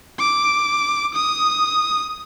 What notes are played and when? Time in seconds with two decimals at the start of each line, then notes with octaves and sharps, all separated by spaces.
0.19 D6
1.15 D#6